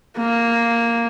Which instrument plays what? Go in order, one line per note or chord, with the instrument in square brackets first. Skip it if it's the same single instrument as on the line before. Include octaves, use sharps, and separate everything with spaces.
[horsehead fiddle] A#3